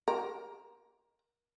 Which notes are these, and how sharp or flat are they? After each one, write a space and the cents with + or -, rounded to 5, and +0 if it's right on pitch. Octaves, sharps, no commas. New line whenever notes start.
A#4 +20